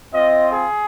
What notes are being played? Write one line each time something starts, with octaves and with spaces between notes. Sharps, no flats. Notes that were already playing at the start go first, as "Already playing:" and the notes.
C4 F4 D#5
G#4